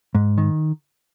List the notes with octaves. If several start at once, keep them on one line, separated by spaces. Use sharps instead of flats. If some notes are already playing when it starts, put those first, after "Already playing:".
G#2
D#3